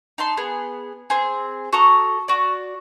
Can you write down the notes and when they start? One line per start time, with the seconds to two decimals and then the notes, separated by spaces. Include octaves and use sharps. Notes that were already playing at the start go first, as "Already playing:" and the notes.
0.18 D#4 A5 C6
0.37 B3 G#4
1.10 C4 G#4
1.73 F#4 A4 A#5 D#6
2.28 F#4 D5